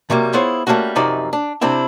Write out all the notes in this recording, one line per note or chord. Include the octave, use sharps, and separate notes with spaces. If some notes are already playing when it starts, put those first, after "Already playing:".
C3 F#3 G3 A#3
B3 E4 F4 G#4 C5 C#5
G3 A3 A#3 C#4 F#4
F#2 C3 F3 D#4 D5
D4
C3 C4 D4 E4